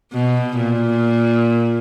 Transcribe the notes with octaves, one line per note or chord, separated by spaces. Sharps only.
B2
A#2